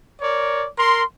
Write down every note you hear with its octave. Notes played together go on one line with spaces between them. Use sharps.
A#4 C#5 D5
A#4 C6